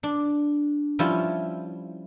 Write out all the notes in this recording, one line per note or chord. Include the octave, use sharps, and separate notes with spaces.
D4
F3 G3 C#4 E4 F4